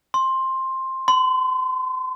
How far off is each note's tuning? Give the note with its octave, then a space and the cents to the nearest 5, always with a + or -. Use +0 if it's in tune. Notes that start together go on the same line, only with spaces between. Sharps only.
C6 +10
C6 -35